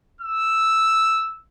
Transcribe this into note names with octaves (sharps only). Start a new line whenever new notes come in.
E6